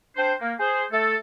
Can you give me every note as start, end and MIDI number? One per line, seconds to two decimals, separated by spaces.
0.16 0.32 60
0.16 0.32 62
0.16 0.32 72
0.40 0.52 58
0.58 0.84 68
0.58 0.84 72
0.91 1.15 57
0.91 1.15 69